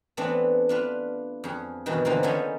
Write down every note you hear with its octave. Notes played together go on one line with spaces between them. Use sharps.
E3 A3 B3 C4 D4 B4
D4 F4 B4
F2 G#4
G2 B2 D#3 E3
D3 E3 F3 A#3 C4
D#3 F3 B3 C#4 A4 G#5